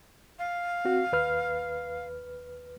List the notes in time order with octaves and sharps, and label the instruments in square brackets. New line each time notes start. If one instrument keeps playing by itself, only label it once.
[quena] F5
[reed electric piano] C4 F#4
D#2 B4 F6